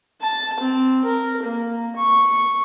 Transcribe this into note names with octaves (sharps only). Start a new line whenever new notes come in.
A5
C4
A#4
A#3
C#6